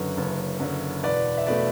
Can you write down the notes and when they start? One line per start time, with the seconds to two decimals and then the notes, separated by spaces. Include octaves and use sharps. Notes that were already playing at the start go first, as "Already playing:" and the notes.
Already playing: F#1 F#2 D3 B4
0.17 F#1
0.60 F#2 D3
1.03 E1 B4 D5
1.38 E5
1.47 B2 A3 B4 D5